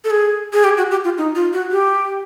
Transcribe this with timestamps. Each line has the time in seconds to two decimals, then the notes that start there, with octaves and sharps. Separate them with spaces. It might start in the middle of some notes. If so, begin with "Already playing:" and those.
0.04 A4
0.10 G#4
0.53 G#4
0.64 G4
0.77 F#4
0.91 G4
1.04 F4
1.18 D#4
1.35 F4
1.53 F#4
1.71 G4